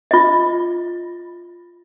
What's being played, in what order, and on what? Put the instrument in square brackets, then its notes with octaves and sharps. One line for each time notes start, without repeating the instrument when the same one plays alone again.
[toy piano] F4 D#5